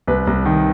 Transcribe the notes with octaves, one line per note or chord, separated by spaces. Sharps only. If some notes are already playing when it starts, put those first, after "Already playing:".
C2 B4
C2
D#3